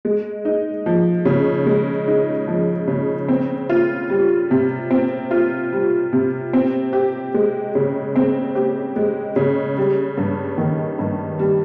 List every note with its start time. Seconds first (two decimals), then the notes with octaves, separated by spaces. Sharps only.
0.05 G#3
0.45 D#4
0.86 F3
1.25 C#3
1.66 G#3
2.07 D#4
2.47 F3
2.88 C#3
3.28 C4
3.69 F4
4.10 G3
4.51 C3
4.91 C4
5.31 F4
5.72 G3
6.13 C3
6.53 C4
6.93 G4
7.34 G#3
7.75 C#3
8.16 C4
8.55 G4
8.96 G#3
9.36 C#3
9.77 G3
10.18 G2
10.58 D#3
10.99 G2
11.39 G3